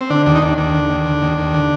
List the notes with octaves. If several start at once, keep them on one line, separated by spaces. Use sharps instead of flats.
C4
D3 D4
D#2 D4
D#4
D#2 D4
D#2 D4
D3
D#2
D3
D#2
D#2
D3